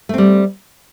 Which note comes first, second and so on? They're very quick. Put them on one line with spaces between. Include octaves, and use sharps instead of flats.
A3 C4 G3